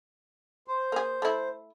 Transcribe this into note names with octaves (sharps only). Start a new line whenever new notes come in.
C5
A#3 G#4
A3 E4